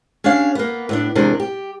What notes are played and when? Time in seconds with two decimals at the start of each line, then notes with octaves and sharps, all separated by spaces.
0.24 C#4 D4 G4 C#5 F5
0.55 A#3 B3
0.89 A2 B3 D4
1.15 E2 C3 G#3 D4 A#4
1.40 G4